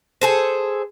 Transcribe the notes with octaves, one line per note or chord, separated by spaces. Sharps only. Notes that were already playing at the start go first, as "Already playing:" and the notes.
G#4 A4 C5